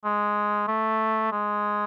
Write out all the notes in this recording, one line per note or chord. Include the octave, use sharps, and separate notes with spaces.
G#3
A3
G#3